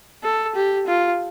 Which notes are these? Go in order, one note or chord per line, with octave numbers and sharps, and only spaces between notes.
A4
G4
F4